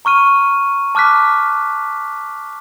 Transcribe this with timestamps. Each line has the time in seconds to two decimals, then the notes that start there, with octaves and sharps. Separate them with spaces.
0.05 A#5 C#6 F6 D#7
0.95 A5 D6 F6 F#6 B6